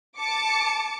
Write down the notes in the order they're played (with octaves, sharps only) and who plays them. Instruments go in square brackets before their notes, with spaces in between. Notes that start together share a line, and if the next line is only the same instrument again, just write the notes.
[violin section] A5 D6 C#7